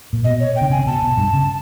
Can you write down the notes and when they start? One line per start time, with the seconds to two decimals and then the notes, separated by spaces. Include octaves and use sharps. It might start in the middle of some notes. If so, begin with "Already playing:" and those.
0.13 A#2
0.24 B2 D#5
0.40 C#5
0.56 G5
0.61 D3
0.70 C#3 G#5
0.79 C3
0.87 B2 A5
1.02 B2
1.17 G2
1.33 C#3